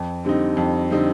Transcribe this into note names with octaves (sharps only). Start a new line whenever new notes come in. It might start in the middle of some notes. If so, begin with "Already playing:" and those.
Already playing: F2
D3 G3 C4 D#4
F2
D3 G3 C4 D#4